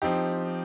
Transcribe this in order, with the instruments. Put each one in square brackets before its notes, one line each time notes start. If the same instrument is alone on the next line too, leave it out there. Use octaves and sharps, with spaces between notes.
[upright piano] F3 C4 D#4 G4